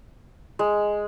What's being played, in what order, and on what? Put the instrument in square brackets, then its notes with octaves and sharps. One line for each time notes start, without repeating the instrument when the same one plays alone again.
[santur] G#3